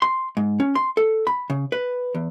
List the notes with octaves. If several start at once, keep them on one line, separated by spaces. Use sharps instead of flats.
C6
G#2
C#4
C6
A4
B5
C#3
B4
E2